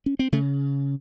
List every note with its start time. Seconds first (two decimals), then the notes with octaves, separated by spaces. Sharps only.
0.06 C#4
0.19 C4
0.32 C#3 A3